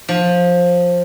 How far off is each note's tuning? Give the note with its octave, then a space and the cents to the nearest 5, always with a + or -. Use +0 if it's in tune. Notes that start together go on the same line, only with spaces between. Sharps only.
F3 +15